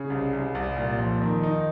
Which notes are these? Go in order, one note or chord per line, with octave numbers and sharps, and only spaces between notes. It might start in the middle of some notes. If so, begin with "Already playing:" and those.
Already playing: C#3
C2
C2
C2
A#2
F2
D#3
D#4